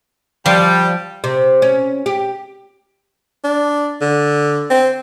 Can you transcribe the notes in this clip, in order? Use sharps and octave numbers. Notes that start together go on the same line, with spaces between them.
F3 G3
C3
C#4
G4
D4
D3
C4